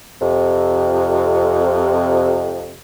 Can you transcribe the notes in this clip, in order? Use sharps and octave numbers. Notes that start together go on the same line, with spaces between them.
F2 C3